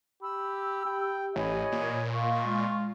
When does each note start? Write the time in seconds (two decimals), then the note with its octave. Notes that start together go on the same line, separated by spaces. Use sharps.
0.22 G4 B5 E6
0.85 G4 G5
1.36 A1 C#5 D#5 G#5 B5
1.72 A#2
2.15 D#5 F5 C6 C#6
2.45 G#3 F4